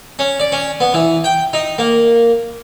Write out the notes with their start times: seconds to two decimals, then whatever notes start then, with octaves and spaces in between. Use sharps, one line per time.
0.19 C#4
0.40 D5
0.52 C#4
0.80 B3
0.94 E3
1.24 G5
1.53 D#4
1.78 A#3